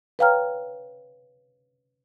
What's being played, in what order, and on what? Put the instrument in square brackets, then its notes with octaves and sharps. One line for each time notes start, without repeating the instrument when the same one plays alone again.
[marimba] B4 C#5 F5 G5 A#5 F6